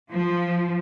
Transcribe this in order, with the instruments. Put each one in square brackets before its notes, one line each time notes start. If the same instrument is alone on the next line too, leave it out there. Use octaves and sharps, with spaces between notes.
[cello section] F3